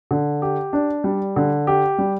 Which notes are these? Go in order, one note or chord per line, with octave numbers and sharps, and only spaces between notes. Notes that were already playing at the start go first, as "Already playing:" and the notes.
D3
G4
D4
G3
D3
G4
G3